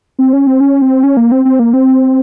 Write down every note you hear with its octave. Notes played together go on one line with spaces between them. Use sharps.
C4
C#4
C4
C#4
C4
C#4
A#3
C4
C4
A#3
C4